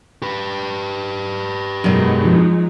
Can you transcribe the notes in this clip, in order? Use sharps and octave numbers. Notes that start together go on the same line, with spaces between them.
G4 B4
F#2 B2 F#3 G#3 D#4
F3